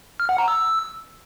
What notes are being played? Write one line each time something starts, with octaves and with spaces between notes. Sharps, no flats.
F6
F#5
A#5
E6